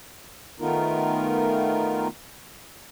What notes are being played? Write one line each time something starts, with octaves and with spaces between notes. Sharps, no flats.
D#3 A3 B3 D#4 F4 A#4